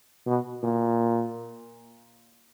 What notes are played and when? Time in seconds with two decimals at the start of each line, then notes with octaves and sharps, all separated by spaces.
0.26 B2
0.63 A#2